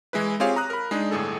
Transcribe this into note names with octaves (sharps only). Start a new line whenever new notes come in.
E3 G#3 E4 B4
C4 F4 G4 G#4 C#5 F5
A#5 D#6 F#6
A#4 B5
G#3 D4 D#4 G#4
G1 A2 G#4 A4